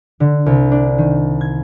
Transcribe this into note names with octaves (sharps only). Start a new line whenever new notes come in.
D3
C2
D4
D#3
G#6